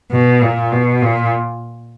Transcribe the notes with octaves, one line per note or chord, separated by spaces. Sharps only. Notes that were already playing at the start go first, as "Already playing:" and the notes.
B2
A#2
B2
A#2